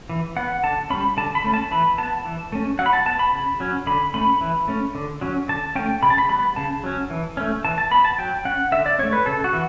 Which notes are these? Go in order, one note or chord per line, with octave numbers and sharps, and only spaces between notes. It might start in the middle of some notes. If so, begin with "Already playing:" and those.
E3
B3 F#5
D3 A5
G3 C#4 B5
D3 A5
B5
A3 C#4
A5
E3 B5
B3 A5
E3
A3 C#4
F#3 F#5
B5
A5
B3 A5
B5
C#3
F#3 C#4
D3 B5
A3 C#4 B5
E3
A3 C#4
D3
F#3 C#4
D3 A5
A3 C#4 G5
C#3 B5
A5
B5
G3 B3 B5
C#3 A5
F#3 C#4
E3
A3 C#4
E3 A5
A5
B3 B5
A5
F#3 G5
C#4 F#5
D3 E5
D5
A3 C#4 C#5
B4
C#3 A4
F#4
E3